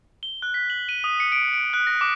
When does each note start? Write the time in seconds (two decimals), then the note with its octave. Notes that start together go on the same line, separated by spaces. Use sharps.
0.23 G7
0.42 F#6
0.54 B6
0.70 F#7
0.89 D#7
1.04 D#6
1.20 C#7
1.32 D7
1.53 D7
1.73 F#6
1.87 A#6
2.01 D6